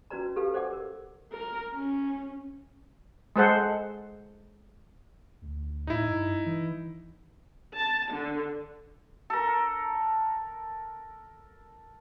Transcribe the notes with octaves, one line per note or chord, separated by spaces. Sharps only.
C#4 F#4 B4 D5 A#5
G4 A4 B4 F5
C5 D5 F#5 D6
A#4
A#4
C#4
G#3 A4 C5 F#5
D2
A2 D#4 E4
G2
E3
A5
D3
A4 A#4